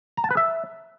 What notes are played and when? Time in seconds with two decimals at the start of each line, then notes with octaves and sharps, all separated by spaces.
0.17 A#5
0.24 A5
0.31 B4
0.37 E5